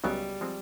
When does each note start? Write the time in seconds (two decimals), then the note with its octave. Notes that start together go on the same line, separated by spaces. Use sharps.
0.04 C#2 C#3 F#3 G3 B3
0.41 F3 G#3 C4